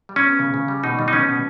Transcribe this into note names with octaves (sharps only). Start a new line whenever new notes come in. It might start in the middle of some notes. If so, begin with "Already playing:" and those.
G3
C#4
B3
C#3
C#3
G3
B2 D#4
G3
D#4
B3 C#4
B2